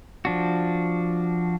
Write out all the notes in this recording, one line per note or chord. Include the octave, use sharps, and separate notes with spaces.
F3 D4 F#4